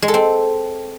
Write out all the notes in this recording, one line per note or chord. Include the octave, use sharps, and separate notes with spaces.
G#3
A4
C4